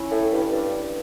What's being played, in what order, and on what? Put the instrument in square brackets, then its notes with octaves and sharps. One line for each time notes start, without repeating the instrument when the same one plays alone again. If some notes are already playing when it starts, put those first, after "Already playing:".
Already playing: [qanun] C#4 E4
[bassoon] A2
G2
G2